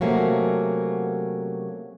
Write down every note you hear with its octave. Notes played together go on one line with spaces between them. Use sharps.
C3 F#3 A3 A#3 C#4 F#4